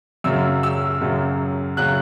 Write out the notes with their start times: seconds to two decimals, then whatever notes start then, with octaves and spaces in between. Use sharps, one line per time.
0.24 F#2 C#3 F#3 E6
0.63 E6
1.01 F#2 C#3 F#3
1.77 C#3 F#3 F#6